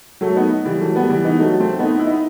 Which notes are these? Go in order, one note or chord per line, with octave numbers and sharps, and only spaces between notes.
F#3 A3
B3 D#4
E3 G3
F#3 A3
G3 B3
E3 G3
B3 D#4
F#3 A3
A3 C4
B3 D#4
E4
D#4